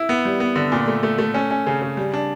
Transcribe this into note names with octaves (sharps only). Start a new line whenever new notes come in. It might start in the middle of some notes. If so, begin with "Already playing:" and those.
Already playing: E4
B3
G3
B3
D3
A#2
A3
A3
A3
C#4
C#4
C#3
C#3
G3
D4